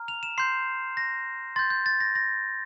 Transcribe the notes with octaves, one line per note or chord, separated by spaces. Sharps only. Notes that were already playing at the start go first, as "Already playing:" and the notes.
Already playing: A#5 F6
F7
E7
C6 G6 C7
A#6
C6 G6 A6
G6
A6
A#6
A#6